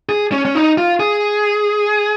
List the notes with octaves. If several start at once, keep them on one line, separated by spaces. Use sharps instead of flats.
G#4
C#4
C#4
D#4
F4
G#4